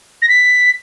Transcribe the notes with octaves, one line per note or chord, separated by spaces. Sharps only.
A#6
B6